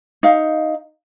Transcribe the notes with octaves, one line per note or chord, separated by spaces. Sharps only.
D#4 F5